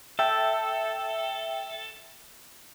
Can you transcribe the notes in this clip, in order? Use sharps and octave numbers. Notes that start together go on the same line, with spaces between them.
A4 E5 G5 E6